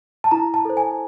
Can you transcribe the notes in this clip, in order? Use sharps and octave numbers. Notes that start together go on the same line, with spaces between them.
A5
E4 A#5
A5
A4 C5
G#5